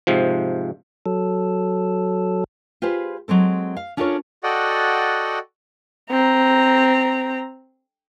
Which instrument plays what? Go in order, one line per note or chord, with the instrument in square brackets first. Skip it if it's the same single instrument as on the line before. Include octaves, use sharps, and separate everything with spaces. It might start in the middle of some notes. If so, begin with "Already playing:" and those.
[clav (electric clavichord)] G#2 C3 F3
[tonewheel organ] F#3 A4
[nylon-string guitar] F4 G4 G#4 B4 C5
F#3 G#3 C4 A4
F5
C#4 D4 F4 A4 A#4 C#5
[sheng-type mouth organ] F#4 A4 D5 D#5 F#5 G5
[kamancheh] C4 A#5